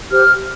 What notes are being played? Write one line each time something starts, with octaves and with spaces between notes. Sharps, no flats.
G4 C5 F6